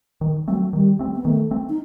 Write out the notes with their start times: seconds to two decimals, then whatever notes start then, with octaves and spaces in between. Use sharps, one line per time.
0.21 D#3
0.48 F#3 A3 C4
0.73 D#3 G3
0.99 A3 C4
1.15 B3
1.25 D#3 A3
1.51 A3 C4
1.69 D#4